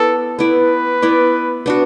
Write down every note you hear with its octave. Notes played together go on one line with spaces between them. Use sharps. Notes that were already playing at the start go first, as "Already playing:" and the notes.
Already playing: B3 E4 A4 D5
B3 E4 B4 D5
B3 E4 D5
B3 D4 F#4